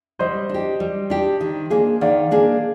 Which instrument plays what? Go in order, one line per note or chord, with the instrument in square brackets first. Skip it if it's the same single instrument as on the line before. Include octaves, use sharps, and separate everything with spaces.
[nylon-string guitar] G3 [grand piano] C5 D#5
[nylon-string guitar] D4
G4
G3
D4 G4
D#3
A#3 D4 G#4
[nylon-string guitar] D#3 [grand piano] D5 F5
[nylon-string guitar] A#3 D4 G#4